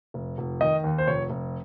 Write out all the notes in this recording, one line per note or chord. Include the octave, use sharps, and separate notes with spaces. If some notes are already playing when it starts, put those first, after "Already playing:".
F1
F1
D#3 D#5
D#2
C5
F1 C#5
F1